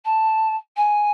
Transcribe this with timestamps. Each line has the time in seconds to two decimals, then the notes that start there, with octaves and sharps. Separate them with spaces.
0.05 A5
0.76 G#5